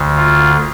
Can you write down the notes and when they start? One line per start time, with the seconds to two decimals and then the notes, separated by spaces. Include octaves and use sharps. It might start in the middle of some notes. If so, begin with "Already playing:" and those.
Already playing: D2 D3
0.16 F4